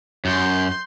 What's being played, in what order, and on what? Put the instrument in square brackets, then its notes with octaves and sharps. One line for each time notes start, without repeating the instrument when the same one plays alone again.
[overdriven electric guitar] F#2 [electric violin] C6 G6